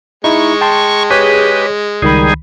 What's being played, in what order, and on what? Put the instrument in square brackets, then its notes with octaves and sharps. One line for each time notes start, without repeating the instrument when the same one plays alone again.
[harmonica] G#3 [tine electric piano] D#4 E4 [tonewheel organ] C#6
[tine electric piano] G5 A5 C6
[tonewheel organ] G4 B4 [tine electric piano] G#4 C#5
[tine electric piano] C#2 D#3 B5 [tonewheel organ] G3 D#4 G#4